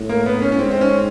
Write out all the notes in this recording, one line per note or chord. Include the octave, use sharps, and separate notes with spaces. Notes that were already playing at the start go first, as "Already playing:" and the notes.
Already playing: A2
A#3
B3
C#4
C#4
G#2 C4
C4
C#4